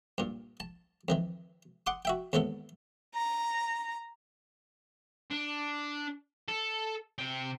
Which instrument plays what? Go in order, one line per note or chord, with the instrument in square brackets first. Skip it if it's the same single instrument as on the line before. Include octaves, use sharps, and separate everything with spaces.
[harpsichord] G2 A#2
A5
F2 D#3 E3
F#5 C6 D6 D#6
F#4 E5 G5
D#2 G#2 E3 B3 A4
[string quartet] A#5
[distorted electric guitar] D4
A4
C3 G5